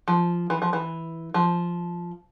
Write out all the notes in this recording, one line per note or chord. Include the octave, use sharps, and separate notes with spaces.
F3
E3
F3
E3
F3